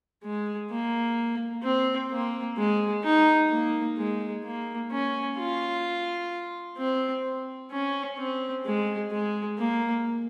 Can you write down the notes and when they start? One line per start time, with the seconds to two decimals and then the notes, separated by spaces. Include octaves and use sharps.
0.24 G#3
0.71 A#3
1.63 C4
2.11 A#3
2.57 G#3
3.04 D#4
3.51 A#3
3.98 G#3
4.44 A#3
4.92 C#4
5.38 F4
6.78 C4
7.71 C#4
8.18 C4
8.66 G#3
9.11 G#3
9.58 A#3